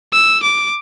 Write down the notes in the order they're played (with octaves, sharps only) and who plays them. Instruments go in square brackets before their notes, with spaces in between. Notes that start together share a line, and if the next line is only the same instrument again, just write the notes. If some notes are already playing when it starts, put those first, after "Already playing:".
[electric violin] E6
D6